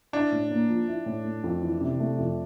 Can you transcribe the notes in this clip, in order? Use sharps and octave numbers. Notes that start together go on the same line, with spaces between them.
D4 E4
A2
A#3
F3
E4
A2
A3
F2
E3
C3
A3
F2